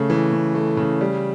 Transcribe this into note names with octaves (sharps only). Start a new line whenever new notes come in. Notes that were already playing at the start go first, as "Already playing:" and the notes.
Already playing: C#3 A3
E3
C#3
A3
C#3
G3